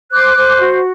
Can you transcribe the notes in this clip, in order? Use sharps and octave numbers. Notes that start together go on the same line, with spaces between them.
C5 D6 F#6
C5
F#4